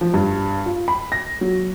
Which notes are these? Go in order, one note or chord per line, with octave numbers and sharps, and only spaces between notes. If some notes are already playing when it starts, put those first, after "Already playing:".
F3
G2
F4
B5
A#6
F#3